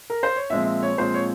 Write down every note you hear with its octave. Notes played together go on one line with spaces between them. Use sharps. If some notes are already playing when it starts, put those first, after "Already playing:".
A#4
C5
C#5
A#2 F3 G#3 C4 E5
E5
C#5
A#2 F3 G#3 C4 C5
C#5